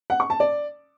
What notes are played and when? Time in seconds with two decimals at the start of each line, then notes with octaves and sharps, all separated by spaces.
0.10 F#5
0.20 C#6
0.30 A5
0.40 D5